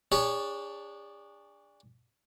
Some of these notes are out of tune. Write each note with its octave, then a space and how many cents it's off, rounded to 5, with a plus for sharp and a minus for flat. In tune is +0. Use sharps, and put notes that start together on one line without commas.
D4 -5 G#4 -40 C#5 +15